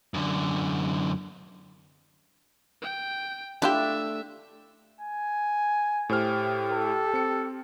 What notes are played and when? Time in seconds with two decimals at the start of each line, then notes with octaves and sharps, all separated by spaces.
0.14 F#2 D3
2.82 G5
3.62 A3 D4 E4 F4 G4 E5
5.01 G#5
6.09 A2 G4 C5 F6
6.73 A4
7.14 C4 C#7